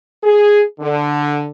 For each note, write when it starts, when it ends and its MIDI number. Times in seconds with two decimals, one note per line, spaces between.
0.23 0.61 68
0.79 1.48 50